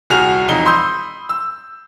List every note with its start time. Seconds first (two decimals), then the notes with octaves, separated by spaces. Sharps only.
0.10 D#1 C2 F#4 G#4 F6 F7
0.48 E1 F2 D#4 G7
0.65 B5 C6 D#6 E6 G6
1.29 E6